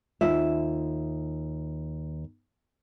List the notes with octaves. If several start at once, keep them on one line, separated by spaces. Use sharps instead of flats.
D#2 F4 E5